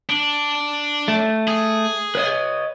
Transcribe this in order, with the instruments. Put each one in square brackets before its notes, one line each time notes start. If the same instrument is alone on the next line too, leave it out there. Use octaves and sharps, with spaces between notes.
[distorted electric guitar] D4
[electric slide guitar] A3
[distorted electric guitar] G#4
[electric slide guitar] B4 C#5 D#5